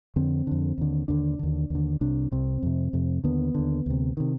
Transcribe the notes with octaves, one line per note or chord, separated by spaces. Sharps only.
F2 D3 C4
F2 D3
D#2 D3
D#2 D3 D4
D#2 D3
D#2 D3
C2 C3 D4
C2 C3 C4
F2 C3
F2 C3
D#2 D3 B3
D#2 D3
D2 C3
C3 D#3